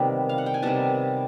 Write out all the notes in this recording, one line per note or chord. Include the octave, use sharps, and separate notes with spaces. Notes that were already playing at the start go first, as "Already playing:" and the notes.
Already playing: C3 D#3 G3 B3
F5
F#5
G5
G#5
C3 D#3 G3 B3 A5